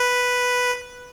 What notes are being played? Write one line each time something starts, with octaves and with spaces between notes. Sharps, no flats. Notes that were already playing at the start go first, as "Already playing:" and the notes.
Already playing: B4